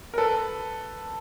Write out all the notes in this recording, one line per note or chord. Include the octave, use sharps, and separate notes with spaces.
A#4
A4 B4